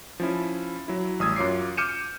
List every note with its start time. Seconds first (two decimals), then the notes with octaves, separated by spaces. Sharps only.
0.20 F3 C#4 E4
0.88 F#3 E4
1.20 A1 G3 D#6 E6 G#6
1.36 F#2 F4 C#5 D6 C7
1.77 D6 F6 G6 C#7 D#7 E7